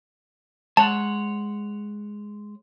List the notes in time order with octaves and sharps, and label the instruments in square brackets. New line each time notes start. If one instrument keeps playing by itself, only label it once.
[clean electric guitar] G#3 C#5 F#5 [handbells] A5